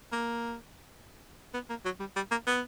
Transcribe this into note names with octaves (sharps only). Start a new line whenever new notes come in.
A#3
B3
A#3
F#3
G3
G3
A#3
B3